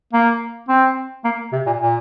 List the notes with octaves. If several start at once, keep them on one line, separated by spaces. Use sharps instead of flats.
A#3
C4
A#3
C3
A#2
A#2